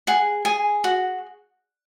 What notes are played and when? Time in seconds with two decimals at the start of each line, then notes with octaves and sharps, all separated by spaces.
0.07 G#4 F#5
0.45 G#4 G#5
0.84 F#4 F#5